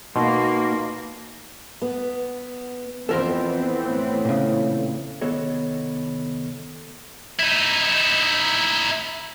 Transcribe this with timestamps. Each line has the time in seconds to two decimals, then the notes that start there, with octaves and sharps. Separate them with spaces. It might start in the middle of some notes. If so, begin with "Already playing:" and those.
0.16 B2 A#3 D#4 C6
1.82 B3
3.09 F2 E3 B3 C4 A4 A#4 C5
3.85 A2
4.25 A#2 C#3
5.21 C2 D#3 B3 A4 C#5 D#5
7.40 D#4 E4